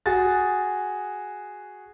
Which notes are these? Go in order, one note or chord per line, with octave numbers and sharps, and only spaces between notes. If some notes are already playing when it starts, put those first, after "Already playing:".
F#4 G#4 A6